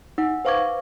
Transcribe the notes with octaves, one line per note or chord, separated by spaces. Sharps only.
D#4 F#5
B4 C5 F5 C#6 D6 G#6